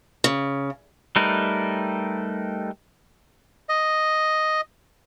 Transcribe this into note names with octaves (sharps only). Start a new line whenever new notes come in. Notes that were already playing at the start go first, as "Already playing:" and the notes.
C#3
G3 A3 D#4 A#4 B4
D#5